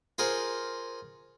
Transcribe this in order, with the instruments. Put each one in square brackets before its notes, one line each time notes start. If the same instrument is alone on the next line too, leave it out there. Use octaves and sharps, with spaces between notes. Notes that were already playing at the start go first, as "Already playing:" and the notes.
[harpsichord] F4 G#4 A#4 C5 F#5